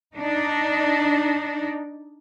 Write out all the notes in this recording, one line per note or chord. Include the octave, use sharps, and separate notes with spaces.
D4 D#4